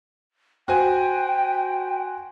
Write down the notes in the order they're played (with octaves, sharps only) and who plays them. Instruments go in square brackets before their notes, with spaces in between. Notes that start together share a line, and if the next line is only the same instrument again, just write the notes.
[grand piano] F#4 C5 G#5 [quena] G5